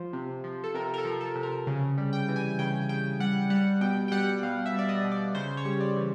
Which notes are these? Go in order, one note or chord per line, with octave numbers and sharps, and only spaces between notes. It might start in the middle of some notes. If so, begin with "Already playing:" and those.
Already playing: F3 C5
C3
F3
A4
C3 A#4
A#4
A4
F3
A4
C3
A#4
C#3
G3
G5
E3
G#5
C#3 G5
C#3 G5
G3 F#5
G3 F#5
B2 G5
G5
G3 F#5
B2 F5
E5
G3
D5
D#5
B2
D5
C#3 C5
C#5
G3
D5
E3